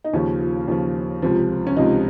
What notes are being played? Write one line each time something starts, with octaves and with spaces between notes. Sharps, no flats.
D#4
D#2 C#3 F3 C#4
F4
D#2 C#3 F3
C#2 C3 F3
C#4
C#2 C3 F3 D#4